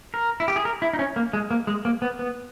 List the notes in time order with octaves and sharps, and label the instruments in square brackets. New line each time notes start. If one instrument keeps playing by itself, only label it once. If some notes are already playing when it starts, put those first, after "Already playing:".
[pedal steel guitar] A#4
E4
G4
G#4
A#4
E4
D#4
C#4
A#3
G#3
A#3
G#3
A#3
B3
B3